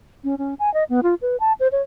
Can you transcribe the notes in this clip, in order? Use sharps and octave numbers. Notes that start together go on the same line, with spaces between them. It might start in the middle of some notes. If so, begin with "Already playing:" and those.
C#4
C#4
G#5
D#5
B3
F4
B4
A5
C5
C#5